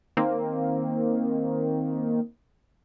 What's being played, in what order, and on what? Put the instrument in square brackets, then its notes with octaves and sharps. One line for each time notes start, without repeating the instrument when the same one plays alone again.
[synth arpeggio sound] D#3 A#3 C4